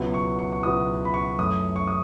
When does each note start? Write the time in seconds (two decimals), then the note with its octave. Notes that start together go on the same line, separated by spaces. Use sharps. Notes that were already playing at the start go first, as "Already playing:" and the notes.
Already playing: C#2 B2 F#3 B3 E4
0.14 C#6
0.39 C#6
0.52 C#6
0.63 C#2 B2 F#3 B3 E4 D#6
1.05 B5
1.14 C#6
1.38 F#2 E3 A3 E4 D#6
1.76 C#6
1.87 D#6